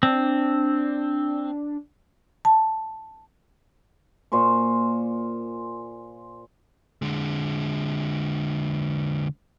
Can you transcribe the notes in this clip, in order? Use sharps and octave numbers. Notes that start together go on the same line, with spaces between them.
C4 D4
A5
A#2 C5 G#5 C#6
D3 G#3